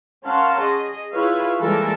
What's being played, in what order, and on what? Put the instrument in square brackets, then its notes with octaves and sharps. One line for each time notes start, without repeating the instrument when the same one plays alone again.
[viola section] C#4 A#4 F5 F#5 A5 C6
G#4 D#5
E4 F4 G#4 B4 C#5 F5
E3 G3 G#3 A#3 A4 A#4